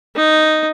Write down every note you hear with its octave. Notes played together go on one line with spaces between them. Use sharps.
D#4